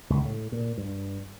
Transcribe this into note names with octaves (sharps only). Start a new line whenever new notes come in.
C#2
A2
A#2
G2